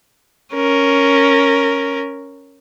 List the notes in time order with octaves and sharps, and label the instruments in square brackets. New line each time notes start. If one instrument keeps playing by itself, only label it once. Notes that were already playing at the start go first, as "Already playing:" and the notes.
[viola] C#4 A#4